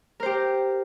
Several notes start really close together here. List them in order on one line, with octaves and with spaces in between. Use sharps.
A#4 C5 G4